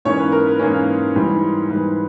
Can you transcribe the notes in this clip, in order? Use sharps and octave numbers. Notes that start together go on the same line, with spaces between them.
G#2 E3 A#3 C#4 C#5
B4
A#4
B4
G#2 E3 A#3 C#4
G#2 E3 G3
G#2 E3 G3 B4